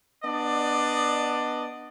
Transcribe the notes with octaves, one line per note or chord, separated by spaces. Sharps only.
B3 D4 D5 D#5